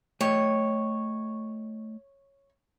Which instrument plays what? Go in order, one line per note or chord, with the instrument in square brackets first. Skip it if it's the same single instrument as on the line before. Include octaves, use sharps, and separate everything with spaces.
[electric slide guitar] A3 D#5 G5 [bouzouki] C#5